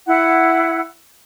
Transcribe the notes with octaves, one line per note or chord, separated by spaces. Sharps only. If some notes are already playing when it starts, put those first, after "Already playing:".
E4 F#5